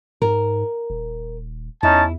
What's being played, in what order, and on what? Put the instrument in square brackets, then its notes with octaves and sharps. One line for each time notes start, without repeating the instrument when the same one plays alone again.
[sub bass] G#2 [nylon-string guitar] A#4
[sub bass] D#1
[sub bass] E2 [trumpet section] C#4 D#4 A5 [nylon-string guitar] E4